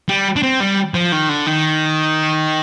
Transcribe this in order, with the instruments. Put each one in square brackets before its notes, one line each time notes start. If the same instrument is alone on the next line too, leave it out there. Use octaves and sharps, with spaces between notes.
[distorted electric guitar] G3
D4
C4
G3
F3
D#3
D3
D#3